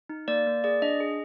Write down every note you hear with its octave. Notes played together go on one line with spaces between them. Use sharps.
D#4
A#3 D5
A#3
G#4 D5
D4 D#5
G#4